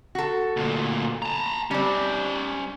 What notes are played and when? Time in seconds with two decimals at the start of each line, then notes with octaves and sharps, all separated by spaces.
0.15 F#4 A4
0.57 D2 A#2
1.22 A5 A#5
1.71 G3 C4 C#4 D5